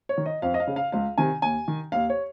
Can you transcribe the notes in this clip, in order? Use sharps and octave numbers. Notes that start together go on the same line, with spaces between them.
C#5
D#3
D#5
F2 F5
D#5
F5
C#3
F5
C#2 F5
C3 D#3 G#5
D#2 G#5
D#3
D#2 F5
C#5